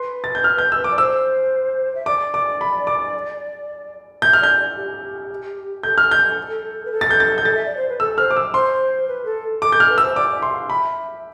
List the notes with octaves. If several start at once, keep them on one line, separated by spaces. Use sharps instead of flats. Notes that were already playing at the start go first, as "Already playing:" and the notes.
Already playing: B4 C6
A6
G6
F6
G6
E6
D6
D5
C5 E6
E5
D5 D6
D6
B5
D6
E5 G6
F6
D5 G6
G4
A4 G6
F6
G6
B4
A4
A6
G6
A6
G6
A6
E5
D5
C5
B4
A4 E6
C5 F6
D6
E6
C5 C6
B4
A4
A4 D6
G6
A4 F6
B4
C5 E6
D5 D6
E5
C6
F5
E5 B5